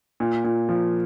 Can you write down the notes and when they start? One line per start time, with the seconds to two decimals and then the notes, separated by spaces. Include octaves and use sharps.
0.20 A#2
0.44 A#2
0.69 F3